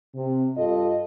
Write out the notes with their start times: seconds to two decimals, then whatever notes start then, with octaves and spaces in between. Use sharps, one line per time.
0.15 C3
0.58 G2 F4 A4 D#5